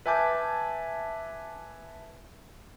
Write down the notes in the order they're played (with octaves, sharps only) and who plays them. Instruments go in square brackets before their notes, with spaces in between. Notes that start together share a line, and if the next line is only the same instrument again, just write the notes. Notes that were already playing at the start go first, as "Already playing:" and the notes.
[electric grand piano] B4 E5 G#5 A5 D6 G6